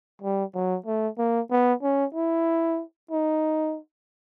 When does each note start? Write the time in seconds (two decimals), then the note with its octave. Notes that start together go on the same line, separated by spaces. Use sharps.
0.22 G3
0.55 F#3
0.86 A3
1.18 A#3
1.51 B3
1.83 C#4
2.15 E4
3.11 D#4